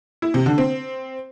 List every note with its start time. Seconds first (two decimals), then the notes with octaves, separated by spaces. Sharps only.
0.22 E4
0.34 C3
0.46 D3
0.58 C4